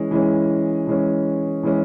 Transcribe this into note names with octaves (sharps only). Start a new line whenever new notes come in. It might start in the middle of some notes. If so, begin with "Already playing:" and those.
Already playing: E3 G#3 C#4
E3 G#3 C#4
E3 G#3 C#4
E3 G#3 C#4